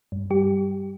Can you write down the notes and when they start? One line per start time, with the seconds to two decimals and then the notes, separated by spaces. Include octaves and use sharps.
0.12 G2
0.30 G3 G4